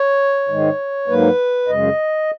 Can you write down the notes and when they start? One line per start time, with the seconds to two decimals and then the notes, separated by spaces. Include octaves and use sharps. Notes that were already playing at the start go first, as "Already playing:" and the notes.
Already playing: C#5
0.49 G#2 D#3 G#3
1.08 G#2 F#3 A#3 B4
1.68 F#2 C#3 G#3 D#5